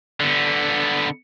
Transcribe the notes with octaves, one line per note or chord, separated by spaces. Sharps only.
D3 B3